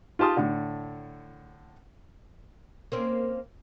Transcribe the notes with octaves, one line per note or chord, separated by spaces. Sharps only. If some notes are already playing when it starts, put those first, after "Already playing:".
F4 G4 A5 C6 D#6
A2 D3
A#3 C4 C#4